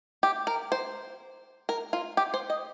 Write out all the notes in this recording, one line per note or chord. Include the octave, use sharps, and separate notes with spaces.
G4
A#4
C5
A#4
F4
G4
C5
D#5